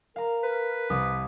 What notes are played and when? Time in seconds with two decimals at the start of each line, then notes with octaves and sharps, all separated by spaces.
0.16 A#4 F5 A#5
0.43 B4
0.90 C2 D#6